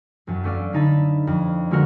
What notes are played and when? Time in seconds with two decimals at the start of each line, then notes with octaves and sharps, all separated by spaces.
0.27 E1 F#2
0.44 A3 C#4 D5 F5
0.73 D3 D#4 A5 B5
1.27 F2
1.71 D3 G#3 A3 F4 F#4 A#4